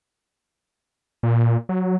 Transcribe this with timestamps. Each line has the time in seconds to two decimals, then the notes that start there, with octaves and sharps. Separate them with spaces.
1.23 A#2
1.69 F#3